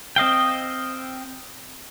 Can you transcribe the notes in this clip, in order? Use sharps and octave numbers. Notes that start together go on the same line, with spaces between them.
C4 D#5 F5 G5